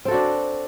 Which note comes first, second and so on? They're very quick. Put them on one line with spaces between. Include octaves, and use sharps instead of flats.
C4 A4 F#4 D4